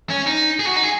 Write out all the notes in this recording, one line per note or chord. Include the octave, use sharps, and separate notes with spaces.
C#4
D#4
G#4
F#4
D#4
G#4